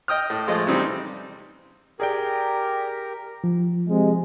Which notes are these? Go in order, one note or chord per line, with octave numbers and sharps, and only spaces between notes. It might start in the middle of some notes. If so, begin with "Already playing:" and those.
D#5 G5 D#6 F6
A2
F3 G#3 A3 D#5
C3 E3 G3 C4 D#4
G4 G#4 A#4 D5 G5
F3
C3 G#3